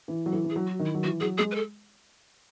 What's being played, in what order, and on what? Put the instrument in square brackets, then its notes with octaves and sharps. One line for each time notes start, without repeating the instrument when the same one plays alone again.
[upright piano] E3
F#3
[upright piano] E3 [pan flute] A4
[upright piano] E3
[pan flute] G#4
[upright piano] F#3
[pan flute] F#4
[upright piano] D#3
[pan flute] E4
[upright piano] F#3
[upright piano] E3 [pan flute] F#4
[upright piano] F#3 [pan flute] G#4
[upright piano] G#3 [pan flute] G#4
[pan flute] B4
A4